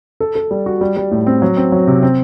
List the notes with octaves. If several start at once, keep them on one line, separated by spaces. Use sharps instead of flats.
A4
A4
G3
F#4
G3
G3
A2
C4
F#3
C4
F#3
C3
C4